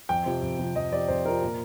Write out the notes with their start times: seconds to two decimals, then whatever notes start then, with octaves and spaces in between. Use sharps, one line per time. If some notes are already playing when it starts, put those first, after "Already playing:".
0.09 F2 G5
0.26 C3 F3
0.42 F2
0.59 C3 F3
0.75 F2 D#5
0.92 C3 F3 D5
1.08 F2 C5
1.25 C3 F3 A#4
1.42 A#2